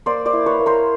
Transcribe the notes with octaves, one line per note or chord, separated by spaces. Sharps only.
A#3 C5 D5
C5 D5
E4
B4 C#5
A#3
A#4 C5